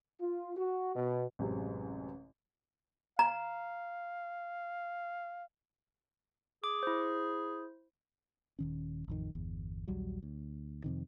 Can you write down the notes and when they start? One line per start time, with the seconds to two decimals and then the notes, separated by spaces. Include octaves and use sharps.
0.21 F4
0.57 F#4
0.96 B2
1.39 A1 F#2 C3 G#3
3.19 F5 A#5
6.64 G#4 D6
6.83 E4 C5
8.59 D#1 D#3 C#4
9.08 A1 F2 D#3
9.35 G1 E2
9.88 A#1 D#2 F#3 G3
10.23 D2
10.84 F2 C3 D#3